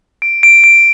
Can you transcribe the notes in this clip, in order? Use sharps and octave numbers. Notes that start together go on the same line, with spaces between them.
D7
D7
D7